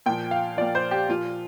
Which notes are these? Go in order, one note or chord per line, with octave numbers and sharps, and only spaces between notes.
A#2 F3 G5
F5
A#2 F3 D5
C5
G4
A#2 F3 F4